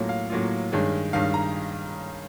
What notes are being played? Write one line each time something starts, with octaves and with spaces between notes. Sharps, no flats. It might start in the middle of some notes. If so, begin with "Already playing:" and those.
Already playing: A2 F#3 A#3 C#4 F4
F5
A2 F#3 A#3 C#4 F4
G2 D#3 G#3 C#4
G2 D#3 G#3 C#4 F5
A#5